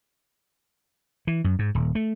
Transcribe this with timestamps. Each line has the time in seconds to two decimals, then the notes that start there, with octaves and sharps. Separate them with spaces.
1.27 E3
1.44 F#2
1.59 G#2
1.75 D#1
1.95 A3